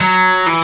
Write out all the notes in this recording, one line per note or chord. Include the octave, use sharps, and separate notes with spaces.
F#3
E3